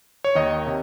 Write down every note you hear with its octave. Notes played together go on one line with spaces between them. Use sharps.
C#5
D#2 D#3 D#5
C3